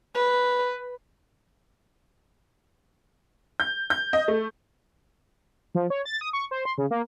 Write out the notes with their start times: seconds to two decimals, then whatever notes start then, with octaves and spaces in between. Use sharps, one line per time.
0.15 B4
3.60 G6
3.90 G6
4.13 D#5
4.28 A3
5.75 F3
5.90 C#5
6.05 A6
6.21 D#6
6.33 C#6
6.51 C5
6.65 C6
6.78 C#3
6.91 A#3